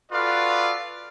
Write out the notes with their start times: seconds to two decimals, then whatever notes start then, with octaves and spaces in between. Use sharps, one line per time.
0.12 F4 F#4 A4 B4 D5 F5